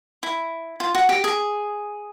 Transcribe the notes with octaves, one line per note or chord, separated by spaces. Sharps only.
E4
F4
F#4
G4
G#4